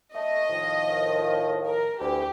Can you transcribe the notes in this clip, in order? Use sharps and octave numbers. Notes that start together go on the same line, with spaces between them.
A3 D#5
A2 D#3 F3
A#4
D2 E3 G4